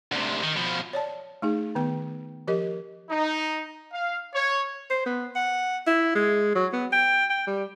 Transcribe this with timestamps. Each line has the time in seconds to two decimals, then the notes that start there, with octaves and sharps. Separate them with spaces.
0.12 D2 C3
0.43 D#3
0.56 B2 F3
0.93 C#5 D5 A5
1.42 A3 D#4 G#4
1.75 D#3 B3 G5
2.47 F3 G4 A#4 D#5
3.10 D#4
3.93 F5
4.34 C#5
4.90 C5
5.06 B3
5.36 F#5
5.87 E4
6.15 G#3
6.55 F#3
6.73 B3
6.92 G5
7.30 G5
7.47 G3